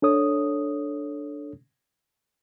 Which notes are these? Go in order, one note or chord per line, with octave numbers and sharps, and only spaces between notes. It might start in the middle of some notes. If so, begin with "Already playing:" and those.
D4 A4 C#5 D#6